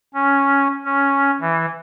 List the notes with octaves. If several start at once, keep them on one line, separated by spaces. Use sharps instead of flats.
C#4
C#4
E3